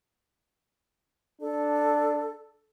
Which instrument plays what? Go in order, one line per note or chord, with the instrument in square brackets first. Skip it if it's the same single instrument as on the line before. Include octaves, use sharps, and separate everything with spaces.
[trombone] D4 [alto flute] A4